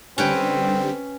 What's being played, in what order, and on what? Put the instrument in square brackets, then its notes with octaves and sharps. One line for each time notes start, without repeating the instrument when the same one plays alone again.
[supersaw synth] D3 G3 [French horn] C4 [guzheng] C#4 B4 G5